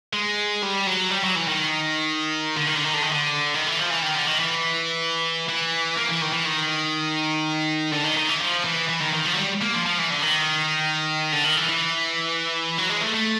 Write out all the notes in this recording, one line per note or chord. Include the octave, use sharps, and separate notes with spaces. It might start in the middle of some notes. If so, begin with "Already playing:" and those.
G#3
G3
F#3
G3
F#3
E3
D#3
D3
D#3
D3
D#3
D3
D#3
D3
D#3
E3
F3
E3
D#3
D3
D#3
E3
E3
A#3
E3
D#3
E3
D#3
D3
D#3
D#3
E3
F3
E3
E3
D#3
D#3
F3
F#3
G3
A#3
F3
F3
E3
D3
D#3
D3
D#3
E3
E3
F#3
G#3
A3
A3